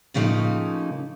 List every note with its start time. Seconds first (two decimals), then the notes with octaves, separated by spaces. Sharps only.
0.14 A2 C#3 F3 G3 A#3 D#4